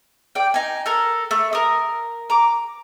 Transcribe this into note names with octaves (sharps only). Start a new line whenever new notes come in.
D5 G5
D#4 G#5
A4 A#4
A3
A#4 D#6
A#5 D6